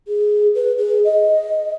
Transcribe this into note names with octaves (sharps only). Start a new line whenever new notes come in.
G#4
B4
G#4
D#5